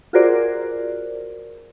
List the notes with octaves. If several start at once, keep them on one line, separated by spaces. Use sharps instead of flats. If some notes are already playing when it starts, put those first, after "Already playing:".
F4 F#4 G#4 A#4 C5 D5